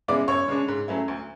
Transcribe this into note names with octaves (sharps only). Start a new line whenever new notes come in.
C#3 G#3 B3 E4 D5 D6
F#2 C#5 C#6
C#3 G#3 D4
G#2
F#3 A3 C#4 E4
D2